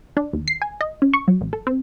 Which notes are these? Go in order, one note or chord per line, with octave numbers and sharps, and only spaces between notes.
D4
D#2
C7
G#5
D#5
C#4
C#6
F#3
A1
A4
C4